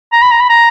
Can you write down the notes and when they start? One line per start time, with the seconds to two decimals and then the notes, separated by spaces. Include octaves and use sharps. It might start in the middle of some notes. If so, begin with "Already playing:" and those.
0.12 A#5
0.22 B5
0.31 A#5
0.40 B5
0.49 A#5